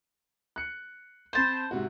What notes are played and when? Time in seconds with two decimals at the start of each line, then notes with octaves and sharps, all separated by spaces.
0.56 F#6 C#7
1.33 C4 C5 A5 B5 C6
1.71 G#2 C3 F#4